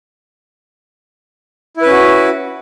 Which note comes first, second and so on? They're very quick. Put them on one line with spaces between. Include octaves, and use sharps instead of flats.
E4 B4 C#4 F#4